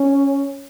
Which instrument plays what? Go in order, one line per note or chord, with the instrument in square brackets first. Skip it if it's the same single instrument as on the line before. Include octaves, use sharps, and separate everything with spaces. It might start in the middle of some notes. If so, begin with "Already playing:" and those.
Already playing: [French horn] C#4